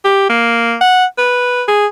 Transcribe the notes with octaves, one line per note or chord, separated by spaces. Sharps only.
G4
A#3
F#5
B4
G#4